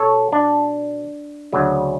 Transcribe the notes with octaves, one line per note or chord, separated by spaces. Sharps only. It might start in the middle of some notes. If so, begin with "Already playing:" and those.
Already playing: B2 A4 C#5
D4
D2 C#3 F#3